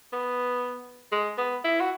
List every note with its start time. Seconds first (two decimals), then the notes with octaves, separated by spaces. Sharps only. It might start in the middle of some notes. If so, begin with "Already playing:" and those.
0.13 B3
1.12 G#3
1.38 B3
1.64 E4
1.80 F#4